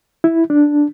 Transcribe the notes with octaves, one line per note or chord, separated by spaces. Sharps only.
E4
D4